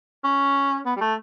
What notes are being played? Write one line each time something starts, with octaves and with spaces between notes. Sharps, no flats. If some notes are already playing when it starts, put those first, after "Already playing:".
C#4
B3
G3
A3